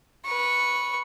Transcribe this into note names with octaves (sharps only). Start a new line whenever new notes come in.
B4 C#6